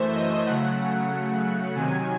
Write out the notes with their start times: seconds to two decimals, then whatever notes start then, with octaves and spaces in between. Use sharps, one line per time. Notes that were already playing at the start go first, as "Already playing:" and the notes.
Already playing: F#2 E3 A3 C5 E5
0.14 D#5
0.46 C#3 F#3 A3 F#5
1.75 C3 D#3 F#3 G#5